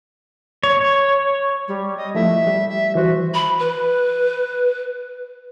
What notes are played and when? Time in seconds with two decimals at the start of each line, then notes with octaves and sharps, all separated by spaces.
0.63 C#5
1.68 G3
1.97 D#5
2.15 F3 A3 E4 E5
2.47 G3
2.68 E5
2.95 E3 F#4 C5
3.34 B5
3.59 B4